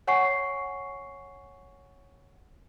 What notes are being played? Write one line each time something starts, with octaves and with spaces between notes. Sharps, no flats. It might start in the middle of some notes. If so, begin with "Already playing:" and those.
C#5 F#5 G#5 C#6 C7